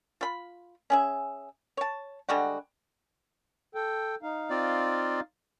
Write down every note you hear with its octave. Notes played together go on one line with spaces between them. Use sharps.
F4 B5
C#4 G#4 E5
C#5 A5
D3 G3 G#3 F#4
A4 G5
D#4 F5
C4 F4 D5